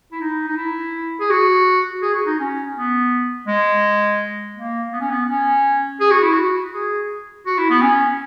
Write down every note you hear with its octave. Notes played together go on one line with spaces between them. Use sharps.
E4
D#4
D#4
E4
G#4
F#4
G#4
F#4
D#4
C#4
B3
G#3
A#3
B3
C#4
B3
C#4
G#4
F#4
E4
F#4
G#4
F#4
E4
B3
C#4